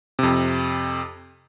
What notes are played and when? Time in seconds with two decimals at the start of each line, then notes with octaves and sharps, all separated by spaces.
0.19 F2 C3